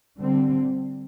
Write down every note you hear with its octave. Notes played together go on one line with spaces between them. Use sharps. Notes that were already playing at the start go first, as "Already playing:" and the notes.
D3 G3 C4